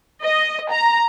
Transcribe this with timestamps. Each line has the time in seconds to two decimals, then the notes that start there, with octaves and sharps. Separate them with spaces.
0.22 D#5
0.71 A#5